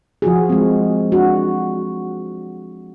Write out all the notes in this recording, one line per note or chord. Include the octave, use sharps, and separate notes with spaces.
F3 F4 F#4 G#4
G#3 C4
D4 F#4